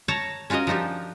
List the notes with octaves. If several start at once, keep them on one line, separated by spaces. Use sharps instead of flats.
C#5 A5 A#5
C#4 F4 F#4 A#4 D#5
F3 D4 D#4 F4 G4